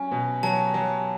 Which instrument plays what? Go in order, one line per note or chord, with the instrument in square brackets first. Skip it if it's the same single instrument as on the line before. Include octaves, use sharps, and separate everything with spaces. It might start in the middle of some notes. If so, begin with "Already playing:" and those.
Already playing: [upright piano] F#3 C#4 [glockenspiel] G#5
[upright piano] B2
[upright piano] F#3 [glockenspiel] A5
[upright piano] F#3